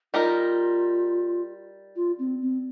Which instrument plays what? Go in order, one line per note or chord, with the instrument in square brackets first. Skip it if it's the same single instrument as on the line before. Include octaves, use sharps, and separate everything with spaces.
[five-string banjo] G3 D#4 A#4 [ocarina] F4
[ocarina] F4
C4
C4